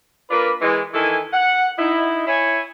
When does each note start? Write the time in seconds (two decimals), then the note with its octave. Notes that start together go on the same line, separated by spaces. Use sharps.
0.31 A#3 D4 F4 A#4 B4
0.61 E3 G#3
0.94 D#3 E3 E4 A4 G#5
1.33 F#5
1.78 D#4 E4
2.27 E4 C#5 G#5